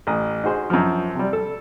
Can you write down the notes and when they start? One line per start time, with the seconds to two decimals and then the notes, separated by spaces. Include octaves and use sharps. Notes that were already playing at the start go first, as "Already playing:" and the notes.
0.07 A1 D#6
0.44 D#4 F#4 G#4 C5 C6
0.70 F#2 F3
1.15 C3 G3
1.33 A4